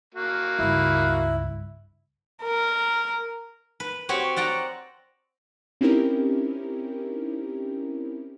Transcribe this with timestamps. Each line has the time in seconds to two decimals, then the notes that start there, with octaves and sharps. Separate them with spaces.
0.14 A#3 F#4
0.59 C#2 G2 E4
2.43 A#4
3.80 B4
4.09 C4 F#4 G4 C#5
4.36 D5 F#5 G5 A#5
5.81 C4 C#4 D#4 E4 G4 A#4